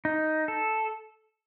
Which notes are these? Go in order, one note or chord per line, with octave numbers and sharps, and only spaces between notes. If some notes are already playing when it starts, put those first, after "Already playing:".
D#4
A4